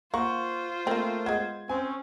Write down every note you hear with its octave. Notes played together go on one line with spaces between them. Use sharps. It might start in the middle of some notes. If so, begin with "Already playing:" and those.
A#3 F4 C5 F#5 C#6
A3 A#3 C4 A#4
G#3 B3 G#6
C4 C#4 G#5